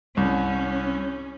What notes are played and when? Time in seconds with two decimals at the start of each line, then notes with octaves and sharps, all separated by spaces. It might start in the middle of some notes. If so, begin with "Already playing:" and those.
0.17 C2 C#4